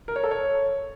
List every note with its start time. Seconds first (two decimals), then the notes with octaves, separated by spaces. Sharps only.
0.08 A#4
0.16 C#5
0.23 A4
0.31 C#5